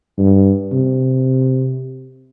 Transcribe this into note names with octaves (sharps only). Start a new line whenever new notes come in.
G2
C3